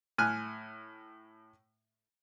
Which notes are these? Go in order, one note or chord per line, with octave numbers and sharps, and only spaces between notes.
A2 G#5 F6 F#6